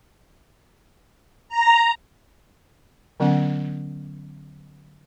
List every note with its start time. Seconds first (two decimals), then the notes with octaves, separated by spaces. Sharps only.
1.49 A#5
3.20 D3 F#3 B3 C#4 F#5